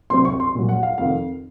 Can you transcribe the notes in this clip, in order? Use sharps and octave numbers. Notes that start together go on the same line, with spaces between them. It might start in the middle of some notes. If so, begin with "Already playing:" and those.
C2 C3 F#3 C4 C6
C#6
C6
A#1 A#2 F#3
F#5
F5
F1 F2 D#3 F5